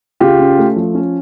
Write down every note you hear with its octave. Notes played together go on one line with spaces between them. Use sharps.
C#3 F4 G4
C#4
A3
F3
C#4